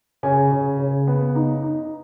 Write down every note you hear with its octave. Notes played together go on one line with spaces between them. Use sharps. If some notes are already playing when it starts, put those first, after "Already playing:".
C#3 G#5
C#3
C#3
B3
D#4
D#4